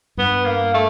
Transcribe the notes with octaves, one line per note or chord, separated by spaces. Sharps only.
G2 B3
A#3
A3